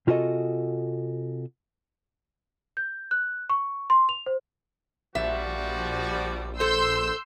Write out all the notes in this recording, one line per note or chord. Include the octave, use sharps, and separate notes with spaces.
C3 F4 F#4 G#4 A4 D#5
G6
F#6
C#6
C6
F7
C5
A#1 F3 G3 F#4 E5
A4 C5 C6 E6 G6